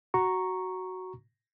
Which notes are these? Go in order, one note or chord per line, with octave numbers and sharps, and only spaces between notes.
F#4 A#5 C#6